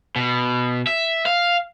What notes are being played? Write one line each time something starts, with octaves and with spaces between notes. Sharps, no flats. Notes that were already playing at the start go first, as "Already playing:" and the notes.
B2
E5
F5